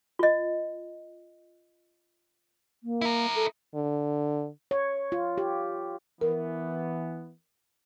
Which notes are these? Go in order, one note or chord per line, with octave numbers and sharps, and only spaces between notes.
F4 D#5
A#3
E4 A#4
A4
D3
C#5
F4
G4
E3 B3 A#4